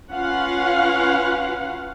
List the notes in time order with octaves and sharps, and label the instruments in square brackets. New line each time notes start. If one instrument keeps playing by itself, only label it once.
[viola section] C#4 F4 B4 F5 F#5